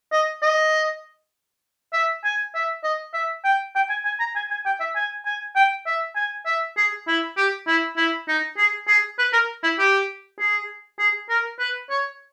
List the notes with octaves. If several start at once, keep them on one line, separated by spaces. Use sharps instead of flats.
D#5
D#5
E5
G#5
E5
D#5
E5
G5
G5
G#5
G#5
A#5
G#5
G#5
G5
E5
G#5
G#5
G5
E5
G#5
E5
G#4
E4
G4
E4
E4
D#4
G#4
G#4
B4
A#4
E4
G4
G#4
G#4
A#4
B4
C#5